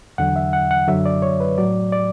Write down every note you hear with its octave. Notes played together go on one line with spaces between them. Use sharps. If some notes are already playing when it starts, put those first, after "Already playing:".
E2 D3 F#3 F#5
E5
F#5
F#5
F#2 D3 F#3 E5
D5
C#5
B4
A2 F#3 D5
D5